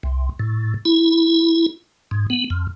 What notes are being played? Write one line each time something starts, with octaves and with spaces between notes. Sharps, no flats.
C2
A2
E4
G#2
B3
F2